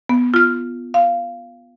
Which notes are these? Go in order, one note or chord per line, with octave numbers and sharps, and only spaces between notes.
B3
F4 F6
F5